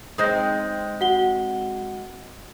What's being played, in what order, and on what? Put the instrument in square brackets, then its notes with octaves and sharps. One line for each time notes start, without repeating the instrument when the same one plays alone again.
[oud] G#3 C4 D#4 [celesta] D#6 G6 A#6
[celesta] F#4 F#5 G7